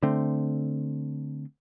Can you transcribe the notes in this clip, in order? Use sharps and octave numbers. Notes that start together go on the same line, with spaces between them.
D3 A3 C4